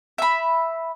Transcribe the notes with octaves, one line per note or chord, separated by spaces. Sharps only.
E5 B5